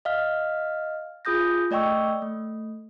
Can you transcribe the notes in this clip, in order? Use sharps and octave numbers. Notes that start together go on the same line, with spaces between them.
D#5 F5 F6
F4 G#4 D#6 G6 A#6
A3 D5 D#5 G5 C#6 E6
A3